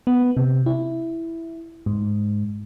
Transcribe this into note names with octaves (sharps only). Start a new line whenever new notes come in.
B3
C3
E4
G#2